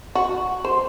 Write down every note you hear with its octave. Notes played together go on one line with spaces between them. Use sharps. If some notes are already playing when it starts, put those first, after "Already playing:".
F#4
C5